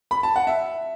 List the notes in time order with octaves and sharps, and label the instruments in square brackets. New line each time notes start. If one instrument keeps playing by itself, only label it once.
[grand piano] B5
A5
F#5
E5